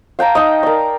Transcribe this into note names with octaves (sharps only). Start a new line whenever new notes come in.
F5 G5 A5 A#5
D#4 D#5
A#4 D5